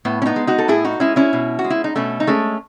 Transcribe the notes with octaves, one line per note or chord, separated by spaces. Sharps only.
A2 B3
C#4
B3 D#4
G#3
D#4 F#4
A4
A2 E4 G#4
D#4 F#4
G#3 C#4 E4
C#4 E4
B2
F#4
G#3
E4
D#4
B2 A3 C#4
D#4
G#3 A3 C#4